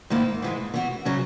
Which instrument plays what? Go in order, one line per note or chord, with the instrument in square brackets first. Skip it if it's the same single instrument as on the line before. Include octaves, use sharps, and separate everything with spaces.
[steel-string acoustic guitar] G#2 D#3 A#3 E4
G#2 E3 G#3
E3 B3 F#4
C#3 F#3 C#4